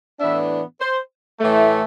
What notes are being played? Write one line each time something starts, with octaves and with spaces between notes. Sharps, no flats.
A2 E3 B3 D4 E5
C5
A2 E3 A3